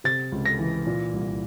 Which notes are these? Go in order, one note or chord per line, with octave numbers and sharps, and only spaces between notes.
C3 A6
C#2
A#6
E3
A#2
C2